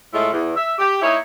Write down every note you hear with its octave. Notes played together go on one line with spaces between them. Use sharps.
A2 G#3 A3 E4 F4 A4
E2
E5
G4
A#3 D#4 E4 C#5